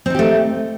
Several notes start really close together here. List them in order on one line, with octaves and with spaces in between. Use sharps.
C4 D#4 G4 A3